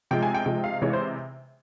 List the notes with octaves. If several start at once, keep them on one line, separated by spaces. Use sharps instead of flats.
C3 F3 G#3 G5
G#5
G5
C3 F3 G#3 G5
F5
C3 E3 G#3 C#5
C5